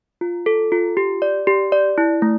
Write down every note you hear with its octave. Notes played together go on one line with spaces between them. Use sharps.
F4
A4
F4
G4
D5
G4
D5
E4
A3